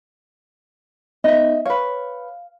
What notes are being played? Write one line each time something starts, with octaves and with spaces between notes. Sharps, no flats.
B3 D#4 D#5 E5
B4 C#5 F5